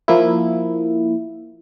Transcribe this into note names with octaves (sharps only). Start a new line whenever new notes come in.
F3 A#3 E4